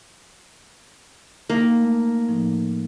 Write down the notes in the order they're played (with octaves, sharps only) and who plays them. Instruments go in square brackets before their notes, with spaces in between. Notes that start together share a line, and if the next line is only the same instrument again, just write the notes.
[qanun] A#3 [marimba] D#4
[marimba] A3
A2 F3 D#4